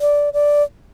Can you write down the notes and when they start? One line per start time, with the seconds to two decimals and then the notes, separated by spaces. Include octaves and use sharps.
0.01 D5
0.34 D5